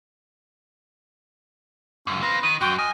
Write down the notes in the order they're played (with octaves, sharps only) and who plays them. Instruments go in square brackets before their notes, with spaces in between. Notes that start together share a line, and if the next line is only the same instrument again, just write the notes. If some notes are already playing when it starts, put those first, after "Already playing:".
[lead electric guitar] C#2 F#2 [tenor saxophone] C#4
[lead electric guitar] C4 F4 [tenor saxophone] B4 [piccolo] A#6
[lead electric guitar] D#3 [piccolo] D#7
[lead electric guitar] F#2 [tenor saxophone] F#4 [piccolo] G5
[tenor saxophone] D#5 [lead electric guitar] G#5 [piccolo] F6